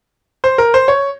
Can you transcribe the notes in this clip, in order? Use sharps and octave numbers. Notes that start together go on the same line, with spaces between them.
C5
A#4
C5
C#5